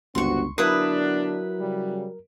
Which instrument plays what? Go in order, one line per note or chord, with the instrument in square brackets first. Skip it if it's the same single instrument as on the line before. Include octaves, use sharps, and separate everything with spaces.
[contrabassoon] G1 [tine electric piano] C#2 [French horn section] C4 F#4 [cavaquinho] C6 C#6
[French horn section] D3 B3 D4 [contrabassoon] F#3 [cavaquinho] E4 B4 D#6 [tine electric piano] A#4
[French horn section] C#3 G3